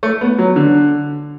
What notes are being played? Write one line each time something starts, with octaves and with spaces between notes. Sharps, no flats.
A3
B3
F#3
D3